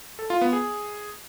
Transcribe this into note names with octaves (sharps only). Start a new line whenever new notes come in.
A4
F4
B3
G#4